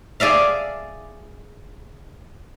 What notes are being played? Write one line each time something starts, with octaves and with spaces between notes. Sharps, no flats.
G#4 D5 E5 F5